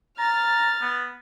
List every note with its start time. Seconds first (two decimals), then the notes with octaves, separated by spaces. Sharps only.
0.19 A#5 F6 A6
0.82 B3